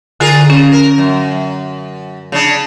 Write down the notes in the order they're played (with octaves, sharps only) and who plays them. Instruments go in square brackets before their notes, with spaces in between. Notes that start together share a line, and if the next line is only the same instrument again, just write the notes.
[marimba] D3 G#5 [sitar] F4 G#4 A#4
[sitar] C#3 [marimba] C#4
[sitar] A#4
F#2
C#3 D4